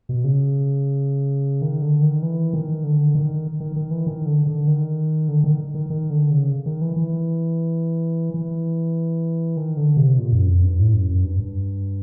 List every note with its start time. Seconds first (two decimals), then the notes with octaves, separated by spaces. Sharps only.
0.09 B2
0.24 C#3
1.62 D#3
1.82 D3
2.02 D#3
2.23 E3
2.54 D#3
2.84 D3
3.15 D#3
3.60 D#3
3.76 D#3
3.91 E3
4.07 D#3
4.26 D3
4.47 D3
4.67 D#3
5.28 D3
5.44 D#3
5.74 D#3
5.90 D#3
6.10 D3
6.31 C#3
6.66 D#3
6.81 E3
6.96 E3
8.34 E3
9.57 D#3
9.77 D3
9.97 C3
10.18 A#2
10.33 F#2
10.48 F2
10.64 G2
10.79 A2
10.94 F#2
11.09 F#2
11.25 G2
11.40 G2